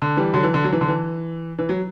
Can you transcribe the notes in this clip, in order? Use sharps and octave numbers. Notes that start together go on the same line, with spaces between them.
D3
E3 G3
D3 F#3
E3
D3
F#3
E3
D3
E3
E3
F#3